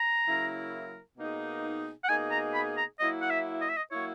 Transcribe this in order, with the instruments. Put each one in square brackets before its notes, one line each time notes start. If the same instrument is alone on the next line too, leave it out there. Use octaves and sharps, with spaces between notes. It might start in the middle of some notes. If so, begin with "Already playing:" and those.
Already playing: [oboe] A#5
[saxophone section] C#3 F#3 A#3 E4 A#4
B2 A#3 D#4 G#4
[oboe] F#5
[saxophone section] B2 A#3 D#4 G#4 [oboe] G#5
[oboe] A#5
B5
A#5
[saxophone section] F#3 A#3 E4 [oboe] D#5
[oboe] F#5
E5
D#5
E5
D#5
[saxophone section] F#3 A#3 E4 [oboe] C#5